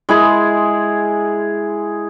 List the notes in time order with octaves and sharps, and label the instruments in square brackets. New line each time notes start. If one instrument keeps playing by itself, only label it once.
[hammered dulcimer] G#3 E4 G#4